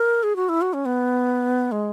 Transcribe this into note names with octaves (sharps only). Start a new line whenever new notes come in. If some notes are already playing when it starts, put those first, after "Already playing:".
Already playing: A#4
G#4
F#4
E4
F#4
C#4
B3
G#3